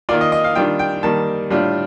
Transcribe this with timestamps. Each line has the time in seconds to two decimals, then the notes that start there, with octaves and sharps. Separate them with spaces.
0.09 D#3 A#3 F4 D5
0.21 D#5
0.32 D#5
0.44 F5
0.55 D#3 G3 D4 F4 G5
0.79 G5
1.03 D#3 G3 A#3 A5
1.50 A2 G3 D4 F4